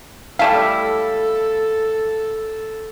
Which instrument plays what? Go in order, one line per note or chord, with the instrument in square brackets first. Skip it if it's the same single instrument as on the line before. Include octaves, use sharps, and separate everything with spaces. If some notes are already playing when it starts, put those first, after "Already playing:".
[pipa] G3 A3 E4 [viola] A4 [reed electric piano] F5